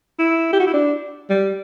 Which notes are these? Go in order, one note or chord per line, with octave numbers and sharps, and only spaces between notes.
E4
G4
F#4
E4
D4
G3